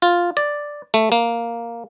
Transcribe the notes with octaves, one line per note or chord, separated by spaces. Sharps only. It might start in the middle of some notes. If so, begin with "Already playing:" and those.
F4
D5
A3
A#3